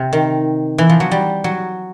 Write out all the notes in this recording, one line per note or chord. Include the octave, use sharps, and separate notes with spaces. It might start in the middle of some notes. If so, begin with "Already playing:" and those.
Already playing: C3
D#3
E3
F3
F#3
G3
F#3